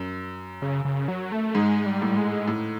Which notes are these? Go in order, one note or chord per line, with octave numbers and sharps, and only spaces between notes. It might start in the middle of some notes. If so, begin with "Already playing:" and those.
Already playing: F#2
C#3
C#3
F#3
A3
G#2 G#3
G3
A2
G#3
A2